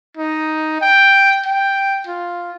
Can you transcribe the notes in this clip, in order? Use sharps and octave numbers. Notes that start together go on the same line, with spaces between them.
D#4
G5
G5
F4